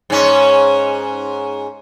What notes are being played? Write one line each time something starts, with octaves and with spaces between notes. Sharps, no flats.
G#2 C#4